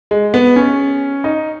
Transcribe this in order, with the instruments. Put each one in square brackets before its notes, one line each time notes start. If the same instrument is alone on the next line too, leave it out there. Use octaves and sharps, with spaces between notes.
[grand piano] G#3
B3
C#4
D#4